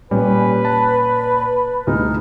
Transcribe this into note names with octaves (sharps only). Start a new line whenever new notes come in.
A#2 G3 C#4 B4 G#5
A5 B5
D2 D#4 F6